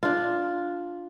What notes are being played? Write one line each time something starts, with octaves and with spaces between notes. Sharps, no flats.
D4 F4